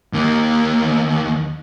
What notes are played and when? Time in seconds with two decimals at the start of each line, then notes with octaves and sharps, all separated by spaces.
0.13 D#2 A#3